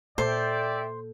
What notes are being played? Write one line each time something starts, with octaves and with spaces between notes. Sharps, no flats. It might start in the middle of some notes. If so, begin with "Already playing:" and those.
A#2 A4 C5 D5 E5 G5